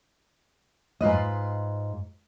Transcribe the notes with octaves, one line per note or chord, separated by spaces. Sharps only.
G#2 F4 B4 D#5